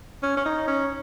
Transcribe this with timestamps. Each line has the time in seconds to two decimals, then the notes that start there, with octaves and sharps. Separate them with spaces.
0.23 C#4
0.37 C#4
0.45 D#4
0.68 C#4